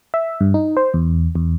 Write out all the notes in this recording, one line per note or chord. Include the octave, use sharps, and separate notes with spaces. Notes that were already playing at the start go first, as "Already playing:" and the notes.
E5
G2
D#4
C5
E2
E2